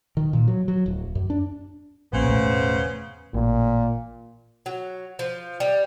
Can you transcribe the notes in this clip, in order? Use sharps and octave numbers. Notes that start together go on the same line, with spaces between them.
D#3
A#2
F#3
F#3
D1
F#2
D4
A#1 A#2 C#3 B3 C5
E1 A2 A3
A1 A#2
F#3
F3
G3